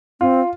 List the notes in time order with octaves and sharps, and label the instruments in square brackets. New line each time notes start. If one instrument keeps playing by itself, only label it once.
[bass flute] C4 [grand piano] F4